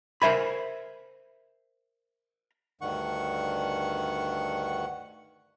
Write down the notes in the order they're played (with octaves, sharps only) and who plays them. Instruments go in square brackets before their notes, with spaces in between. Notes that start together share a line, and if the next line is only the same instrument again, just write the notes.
[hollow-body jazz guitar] A#4 C5 E5 G#5 B5
[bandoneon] D2 G2 D#3 F#5 C#6